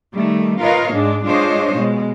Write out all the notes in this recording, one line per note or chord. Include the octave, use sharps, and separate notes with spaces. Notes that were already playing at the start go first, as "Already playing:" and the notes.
D#3 G3 A3
F4 A#4 B4 C#5 D#5 F5
G#2 G#3 D4
G#3 D4 F4 C5 C#5 D#5
B2 G#3